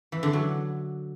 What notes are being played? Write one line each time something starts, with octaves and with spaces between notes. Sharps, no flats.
E3
D3
F#3